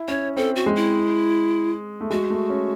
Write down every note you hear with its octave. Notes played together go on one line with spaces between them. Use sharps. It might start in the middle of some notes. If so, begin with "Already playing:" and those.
Already playing: E4
C#4 C#5
C4 A4
F#4
G#3
E4
A3
G#3 F#4
A3
C#4